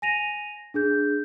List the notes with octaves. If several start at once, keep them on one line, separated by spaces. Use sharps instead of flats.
G#5 A#6 D#7 F7
D4 G#4 G6